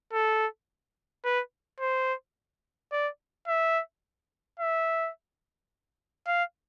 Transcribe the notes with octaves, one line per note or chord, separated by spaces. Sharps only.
A4
B4
C5
D5
E5
E5
F5